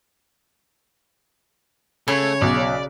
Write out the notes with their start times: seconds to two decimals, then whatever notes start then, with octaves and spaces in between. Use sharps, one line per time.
2.08 C#3 A3 C#5
2.42 B1 D5